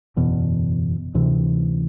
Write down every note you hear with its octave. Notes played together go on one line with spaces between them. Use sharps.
F#1 E2 B2
D2 C3 E3